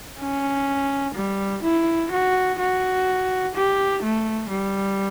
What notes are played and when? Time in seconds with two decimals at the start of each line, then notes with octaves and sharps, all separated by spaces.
0.19 C#4
1.14 G3
1.63 E4
2.11 F#4
2.59 F#4
3.55 G4
4.03 A3
4.50 G3